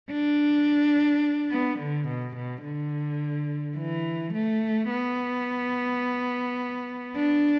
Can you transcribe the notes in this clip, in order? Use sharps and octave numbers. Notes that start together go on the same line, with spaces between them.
D4
B3
D3
B2
B2
D3
E3
A3
B3
D4